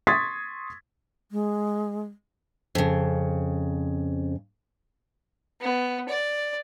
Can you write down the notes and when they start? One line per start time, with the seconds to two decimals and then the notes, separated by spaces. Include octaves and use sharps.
0.07 C6 C#6 D#6 G#6 A6 B6
1.32 G#3
2.75 F2 C#3
5.61 B3
6.08 D5